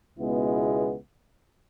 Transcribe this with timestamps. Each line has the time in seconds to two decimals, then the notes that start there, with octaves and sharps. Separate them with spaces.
0.18 C#2 B2 G#3 B3 E4